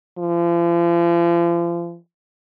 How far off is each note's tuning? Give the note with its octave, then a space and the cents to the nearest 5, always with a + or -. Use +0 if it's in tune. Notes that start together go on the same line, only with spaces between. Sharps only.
F3 -40